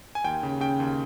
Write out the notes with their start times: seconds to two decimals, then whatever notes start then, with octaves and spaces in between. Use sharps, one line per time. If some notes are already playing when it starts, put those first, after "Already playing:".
0.15 G#5
0.24 D#2 G5
0.43 C#3
0.60 C#3 G5
0.80 D#2